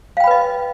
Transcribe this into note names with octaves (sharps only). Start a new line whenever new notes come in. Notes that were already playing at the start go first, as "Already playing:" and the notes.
B4 D#5 F5 G5 B5